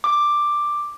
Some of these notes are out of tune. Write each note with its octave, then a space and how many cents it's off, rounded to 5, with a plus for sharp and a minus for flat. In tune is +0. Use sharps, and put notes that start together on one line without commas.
D6 +5